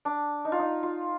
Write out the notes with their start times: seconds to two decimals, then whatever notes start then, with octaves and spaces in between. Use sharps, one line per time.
0.05 D4
0.45 D#4
0.52 F4
0.59 D#4
0.83 F4